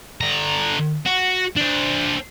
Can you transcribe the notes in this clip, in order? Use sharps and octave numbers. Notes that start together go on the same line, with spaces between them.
D3 A#5
F#4
D4 C5